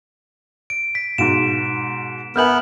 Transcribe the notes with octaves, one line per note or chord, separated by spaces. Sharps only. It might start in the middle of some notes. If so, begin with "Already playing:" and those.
D7
B6
G#2 B2 D7 E7
B3 A#4 E5 G#5 F6 G6 F#7